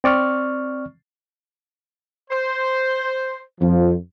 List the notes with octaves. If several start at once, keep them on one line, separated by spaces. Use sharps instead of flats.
C4 D5 C#6 F6
C5
F2 F3